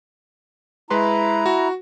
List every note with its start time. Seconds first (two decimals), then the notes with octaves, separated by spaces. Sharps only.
0.90 G#3 E4 B4 A#5 C6
1.46 F#4